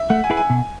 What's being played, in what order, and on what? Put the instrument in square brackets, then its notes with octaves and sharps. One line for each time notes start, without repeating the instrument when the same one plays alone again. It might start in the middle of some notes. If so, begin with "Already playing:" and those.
Already playing: [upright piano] E5
[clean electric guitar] A3 [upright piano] F#5
[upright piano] G#5
[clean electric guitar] E4 G#4 B4
[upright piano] G#5
[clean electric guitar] B2